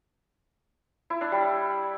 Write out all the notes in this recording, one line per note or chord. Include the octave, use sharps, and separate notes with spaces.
E4
D4
G3